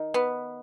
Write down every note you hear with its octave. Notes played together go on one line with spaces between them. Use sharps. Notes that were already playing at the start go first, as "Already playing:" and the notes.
Already playing: D#3 D#4
B3